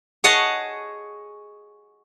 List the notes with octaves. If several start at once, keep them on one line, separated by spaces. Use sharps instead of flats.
G#4 C#5 D#5 F#5 A5